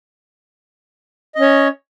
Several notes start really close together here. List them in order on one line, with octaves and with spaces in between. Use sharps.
D#5 C#4 C#5